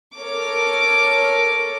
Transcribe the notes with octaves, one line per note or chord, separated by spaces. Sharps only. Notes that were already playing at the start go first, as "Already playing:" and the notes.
A4 A#4 C#5 D6